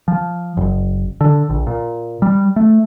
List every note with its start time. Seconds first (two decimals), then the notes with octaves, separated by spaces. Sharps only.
0.08 F3
0.57 F#1
1.21 D3
1.50 A#1
1.67 A#2
2.22 G3
2.56 A3